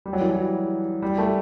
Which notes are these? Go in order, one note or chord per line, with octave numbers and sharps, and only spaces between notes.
G3
F#3
E3
F#3
G3
A3